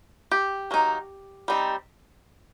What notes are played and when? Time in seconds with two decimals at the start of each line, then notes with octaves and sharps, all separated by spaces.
0.31 G4
0.71 F#3 A#3 D#4
1.48 G3 C4 D#4